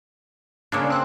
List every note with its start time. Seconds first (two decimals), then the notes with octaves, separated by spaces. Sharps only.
0.72 C#3 G#3 A#3 D4
0.90 C4 F#6